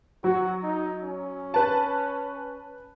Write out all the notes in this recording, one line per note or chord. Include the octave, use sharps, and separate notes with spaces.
F#3 F#4
D#4
C#4
B4 A5